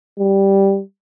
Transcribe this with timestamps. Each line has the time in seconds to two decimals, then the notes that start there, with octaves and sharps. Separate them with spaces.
0.19 G3